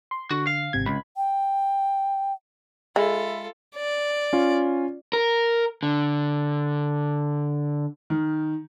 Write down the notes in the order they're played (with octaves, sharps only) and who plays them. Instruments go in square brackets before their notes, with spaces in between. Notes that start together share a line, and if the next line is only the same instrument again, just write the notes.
[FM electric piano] C6
[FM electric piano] D3 [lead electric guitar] F#4
[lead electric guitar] F5
[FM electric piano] G#1 C3 G#6
[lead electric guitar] C#2 [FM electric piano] B5
[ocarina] G5
[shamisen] G#3 [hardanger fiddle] F4 A4 [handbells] E5 B5
[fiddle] D5
[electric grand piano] C#4 F4
[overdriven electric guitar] A#4
D3
[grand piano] D#3